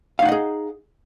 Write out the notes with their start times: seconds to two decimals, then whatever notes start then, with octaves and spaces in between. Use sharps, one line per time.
0.19 F5
0.22 D#4
0.25 F#5
0.29 D#5
0.32 G#4